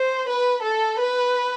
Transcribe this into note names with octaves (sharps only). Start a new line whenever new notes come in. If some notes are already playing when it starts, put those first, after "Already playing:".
Already playing: C5
B4
A4
B4